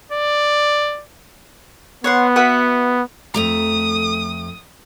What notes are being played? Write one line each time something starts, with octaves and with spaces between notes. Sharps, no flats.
D5
B3 C#5 F#5 C6
F#4 B4 E5
F2 A3 A#5 D#6